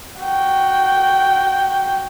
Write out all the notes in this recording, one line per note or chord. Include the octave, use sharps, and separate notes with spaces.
F#4 G5